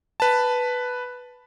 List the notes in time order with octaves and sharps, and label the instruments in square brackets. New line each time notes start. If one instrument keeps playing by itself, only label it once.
[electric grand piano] B4 A5